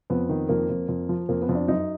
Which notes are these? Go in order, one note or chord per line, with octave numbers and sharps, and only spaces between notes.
F2 B3
D#3
F2 A#3
F2
F2
F3
F2 A#3
B3
F2
D4
F#2 D#4